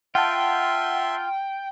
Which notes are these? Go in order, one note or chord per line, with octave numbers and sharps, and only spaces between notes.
F4 E5 F#5 G5 A5 C6